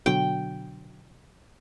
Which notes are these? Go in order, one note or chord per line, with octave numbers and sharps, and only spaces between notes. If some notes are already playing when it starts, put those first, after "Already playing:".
B2 D3 F#3 G5